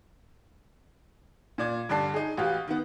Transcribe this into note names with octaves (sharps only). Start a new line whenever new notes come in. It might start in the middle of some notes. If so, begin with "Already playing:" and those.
A#2 D5 G#6
G2 D3 D5 A5 C7
D#4 G#4
A1 F#4 G4 F5
D#3 B3